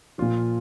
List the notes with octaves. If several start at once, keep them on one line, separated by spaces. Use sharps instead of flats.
A#2 F3 F4